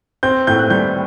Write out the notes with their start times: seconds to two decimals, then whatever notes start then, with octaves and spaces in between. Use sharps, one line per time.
0.23 C4 G6
0.47 A2 G6
0.59 F#6
0.70 G3 G6